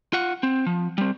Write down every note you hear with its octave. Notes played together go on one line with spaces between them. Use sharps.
F4 F#5
C4
F3
G3 C4